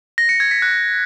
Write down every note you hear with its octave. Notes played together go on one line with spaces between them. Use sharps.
A#6
C#7
G#6
B6
F#6